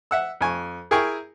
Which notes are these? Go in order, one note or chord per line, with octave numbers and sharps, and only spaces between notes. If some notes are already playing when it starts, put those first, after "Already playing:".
E5 F#5 E6
F2 G#5 C#6
E4 G#4 A#4 G5 G#5 C#6